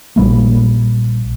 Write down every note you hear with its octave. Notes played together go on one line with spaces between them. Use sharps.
A#1 G3 A#3